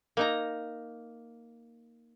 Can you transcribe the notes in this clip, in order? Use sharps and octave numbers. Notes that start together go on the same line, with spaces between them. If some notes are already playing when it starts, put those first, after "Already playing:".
A#3 D#4 A#5